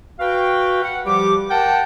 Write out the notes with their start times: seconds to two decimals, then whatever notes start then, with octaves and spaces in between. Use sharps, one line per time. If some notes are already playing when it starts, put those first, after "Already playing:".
0.20 F#4 B4 F5 G5
0.82 F#5
1.06 F3 G3 G4 D6
1.50 A#4 F#5 G5 A5